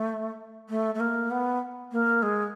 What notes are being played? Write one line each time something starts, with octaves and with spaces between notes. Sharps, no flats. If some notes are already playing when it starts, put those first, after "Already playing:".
Already playing: A3
A3
A3
A#3
B3
A#3
G#3